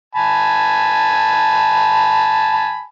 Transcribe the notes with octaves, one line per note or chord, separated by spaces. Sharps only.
G#5 A5 B5